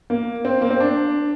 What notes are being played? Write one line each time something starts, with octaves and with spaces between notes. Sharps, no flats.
A#3
C4
A#3
C4
D4